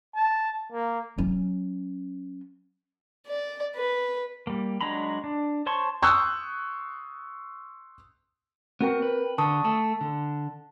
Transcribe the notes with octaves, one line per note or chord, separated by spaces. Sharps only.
A5
A#3
F#3 C#4
D5
B4
G3 A#3
F#3 G#3 D4 A#5 B5
D4
C5 C#5 A5 C6 C#6
C6 C#6 D#6 E6 F#6 G6
B3 C4 F#4 A#4 G5
B4
D3 A5 C#6 D#6
A3 A4 A5
D3